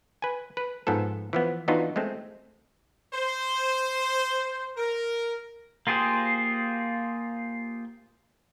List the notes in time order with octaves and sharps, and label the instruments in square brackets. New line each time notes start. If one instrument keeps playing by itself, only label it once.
[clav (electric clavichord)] B4 G#5
B4
G#2 F3 B3 A4
E3 F3 B3
E3 B3 D4 D#4 F4 F#4
G#3 A3 C4
[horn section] C5
A#4
[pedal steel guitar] A#3 F4 G4 G#4 C5